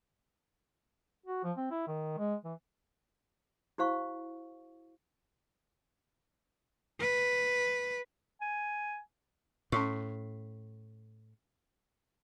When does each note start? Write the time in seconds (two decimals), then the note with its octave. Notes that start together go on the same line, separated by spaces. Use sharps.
1.26 F#4
1.44 F3
1.57 C4
1.71 E4
1.87 D#3
2.18 G#3
2.44 E3
3.78 E4 F#4 C5 F5 C#6
7.00 B4
8.41 G#5
9.72 A2 C#4 C6 C#6